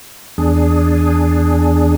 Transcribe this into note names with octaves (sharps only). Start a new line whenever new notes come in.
E2 D4 G#4